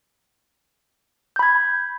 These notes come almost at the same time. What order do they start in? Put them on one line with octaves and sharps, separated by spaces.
G6 B5 G#6